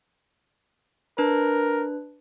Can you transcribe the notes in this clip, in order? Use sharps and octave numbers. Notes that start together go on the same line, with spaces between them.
D4 A#4 B4